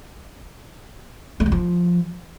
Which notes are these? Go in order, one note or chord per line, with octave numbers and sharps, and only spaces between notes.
A3
G3
F3